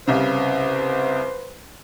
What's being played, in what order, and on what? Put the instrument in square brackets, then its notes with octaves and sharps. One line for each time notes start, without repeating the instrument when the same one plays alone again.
[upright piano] C2 C#3 [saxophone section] B4 C5